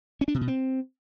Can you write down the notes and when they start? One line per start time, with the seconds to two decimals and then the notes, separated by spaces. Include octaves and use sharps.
0.21 C#4
0.28 D4
0.34 C3
0.41 B2
0.48 C4